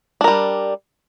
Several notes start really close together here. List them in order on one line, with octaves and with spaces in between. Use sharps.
D4 A#4 G3